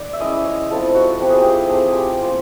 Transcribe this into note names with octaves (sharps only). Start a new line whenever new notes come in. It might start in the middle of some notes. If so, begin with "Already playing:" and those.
Already playing: D5
E5
G#3 C#4 E4 D#5
C#5
F3 A3 C4 E4 A4
F#4
F3 A3 C4 E4 G4
G#4
G4
A3 C4 F4 G#4
G#4
G4
A3 C4 F4